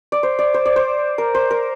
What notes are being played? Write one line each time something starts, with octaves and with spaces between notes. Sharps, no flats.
D5
C5
D5
C5
D5
C5
A#4
C5
A#4